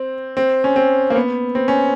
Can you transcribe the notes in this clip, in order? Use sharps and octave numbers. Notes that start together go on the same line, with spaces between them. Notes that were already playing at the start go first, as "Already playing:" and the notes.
Already playing: C4
C4
C#4
C4
A#3
B3
C4
C#4